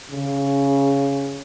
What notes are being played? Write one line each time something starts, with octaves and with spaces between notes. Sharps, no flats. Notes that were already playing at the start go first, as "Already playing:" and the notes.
C#3